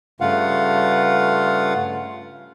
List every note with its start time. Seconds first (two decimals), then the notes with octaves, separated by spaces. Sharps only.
0.21 G2 C#3 A3 F4 F5 F#5